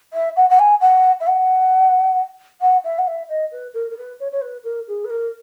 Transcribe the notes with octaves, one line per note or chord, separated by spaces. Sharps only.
E5
F#5
F#5
G#5
F#5
E5
F#5
F#5
E5
F#5
E5
D#5
B4
A#4
A#4
B4
C#5
C#5
B4
A#4
G#4
B4
A#4